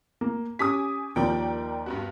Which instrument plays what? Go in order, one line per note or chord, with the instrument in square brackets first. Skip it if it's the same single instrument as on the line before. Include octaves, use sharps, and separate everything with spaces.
[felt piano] A#3
[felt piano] C#4 G4 B6 [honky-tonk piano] G#5 D6 D#6
[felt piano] D#2 F3 [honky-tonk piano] A#4 D5 G5
[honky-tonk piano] G2 B3 F#4